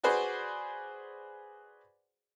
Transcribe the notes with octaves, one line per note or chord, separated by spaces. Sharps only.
F#4 G#4 B4 C5 D5